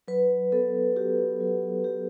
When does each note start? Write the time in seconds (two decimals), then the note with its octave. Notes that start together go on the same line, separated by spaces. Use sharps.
0.08 F#3 B4
0.52 B3 A4
0.96 F#4 G4
1.40 F#3
1.84 F#3 G4